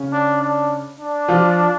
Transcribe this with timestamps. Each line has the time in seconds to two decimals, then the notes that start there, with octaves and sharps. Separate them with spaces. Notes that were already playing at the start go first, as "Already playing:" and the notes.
Already playing: C#3 C#4
0.13 D4
0.42 D4
0.99 D4
1.28 F3 F4